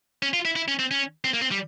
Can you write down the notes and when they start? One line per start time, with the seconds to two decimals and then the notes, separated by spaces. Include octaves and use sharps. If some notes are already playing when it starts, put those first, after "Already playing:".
0.23 C#4
0.33 F4
0.45 E4
0.56 E4
0.68 C#4
0.79 C4
0.91 C#4
1.25 C4
1.34 A#3
1.42 C4
1.51 G3